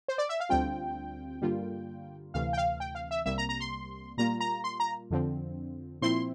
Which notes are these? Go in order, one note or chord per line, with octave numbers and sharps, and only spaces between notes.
C5
D5
E5
F5
D2 D3 G3 C4 F4 G5
G2 D3 G3 A#3 F4
D2 C3 E3 A3 F5
G5
F5
G5
F5
E5
C2 C3 G3 A#3 E5
A#5
A#5
C6
A#2 G3 A#3 F4 A#5
A#5
C6
A#5
F2 D3 F3 C4
A#2 F3 C4 E4 C6